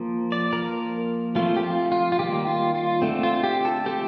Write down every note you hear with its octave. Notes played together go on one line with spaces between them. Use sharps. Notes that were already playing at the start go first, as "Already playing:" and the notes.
Already playing: F3 A#3
D5
F3 A#3 A#4
F3 A3 C4 F4
G4
F4
F4
F4
D#3 G3 A#3 G4
F4
F4
D3 A3 C4
F4
G4
A4
F3 A3 C4 G4